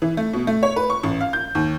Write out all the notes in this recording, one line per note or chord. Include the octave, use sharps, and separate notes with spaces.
E3
A3
B2
A3
C#5
B4
C#6
A1
F5
G6
D#2